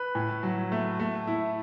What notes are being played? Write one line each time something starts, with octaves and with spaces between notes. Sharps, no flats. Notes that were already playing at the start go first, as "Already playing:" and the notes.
Already playing: B4
A2
F#3
A3
A3
E4